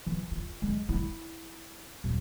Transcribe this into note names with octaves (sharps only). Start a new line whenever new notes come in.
E3
F4
G#3
E4
D#1